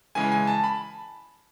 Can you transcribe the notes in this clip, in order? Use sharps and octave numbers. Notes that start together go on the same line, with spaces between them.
C#3 E3 G#3 G#5
G#5
A5
B5